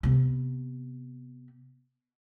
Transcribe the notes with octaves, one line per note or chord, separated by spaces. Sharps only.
C3 B3